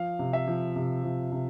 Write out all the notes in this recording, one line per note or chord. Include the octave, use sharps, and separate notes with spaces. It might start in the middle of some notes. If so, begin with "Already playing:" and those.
Already playing: F3 F5
C3
E5
F3
C3
F3
C3